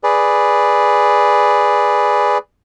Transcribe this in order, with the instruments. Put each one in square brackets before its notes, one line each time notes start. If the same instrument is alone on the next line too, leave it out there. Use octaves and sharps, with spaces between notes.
[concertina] G#4 B4 D5